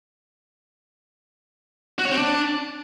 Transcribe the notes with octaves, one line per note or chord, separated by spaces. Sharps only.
F#4
C#5
C4
D4